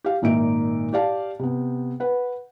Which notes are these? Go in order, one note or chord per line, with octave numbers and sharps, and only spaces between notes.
G4 F5
G#1 A#2 A#3 D#4 E5 D7
G4 D5 F5 A5
C3 B3
B4 F#5